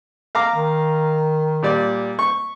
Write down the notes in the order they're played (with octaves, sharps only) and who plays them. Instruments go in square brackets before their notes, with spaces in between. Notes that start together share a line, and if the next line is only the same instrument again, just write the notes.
[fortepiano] F5 A#5 D6
[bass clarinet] D#3
[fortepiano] A#2 G3 D5
C#6